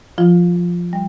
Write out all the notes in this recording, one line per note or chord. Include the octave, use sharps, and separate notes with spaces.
F3 F4
F3
G3